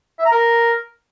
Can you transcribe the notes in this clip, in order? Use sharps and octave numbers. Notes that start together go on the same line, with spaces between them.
E5
A#5
A#4